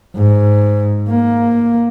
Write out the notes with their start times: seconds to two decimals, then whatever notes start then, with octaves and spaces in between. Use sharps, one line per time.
0.16 G#2
1.09 A#3